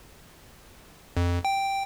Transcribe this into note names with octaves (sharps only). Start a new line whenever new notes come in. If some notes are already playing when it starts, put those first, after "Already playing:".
F2
G5